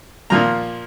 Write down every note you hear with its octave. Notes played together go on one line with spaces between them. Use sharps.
A#2 F3 A#3 A#5